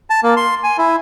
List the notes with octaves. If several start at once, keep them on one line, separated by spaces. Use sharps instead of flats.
A5
A#3
C6
G#5
E4